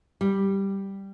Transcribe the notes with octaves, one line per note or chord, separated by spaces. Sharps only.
G3